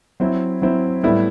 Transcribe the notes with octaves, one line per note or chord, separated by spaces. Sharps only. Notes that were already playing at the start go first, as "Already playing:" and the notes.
F#3 C4 E4
F#3 C4 E4
A2 G3 B3 E4